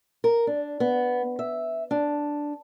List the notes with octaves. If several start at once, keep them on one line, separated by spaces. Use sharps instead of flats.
A#4
D4
B3
E5
D4